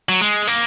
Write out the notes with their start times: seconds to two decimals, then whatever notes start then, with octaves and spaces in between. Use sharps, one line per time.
0.09 F#3
0.21 G#3
0.47 A#3